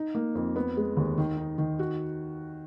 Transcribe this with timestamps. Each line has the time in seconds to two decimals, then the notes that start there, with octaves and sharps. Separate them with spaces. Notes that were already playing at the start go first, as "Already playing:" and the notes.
Already playing: D#4
0.15 A#3
0.35 F2
0.56 B3
0.77 G#3
0.97 D#2
1.18 D#3
1.37 D#4
1.58 D#3
1.79 F#4